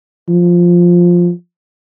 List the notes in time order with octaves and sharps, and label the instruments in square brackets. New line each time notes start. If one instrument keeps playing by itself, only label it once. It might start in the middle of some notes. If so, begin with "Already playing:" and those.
[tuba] F3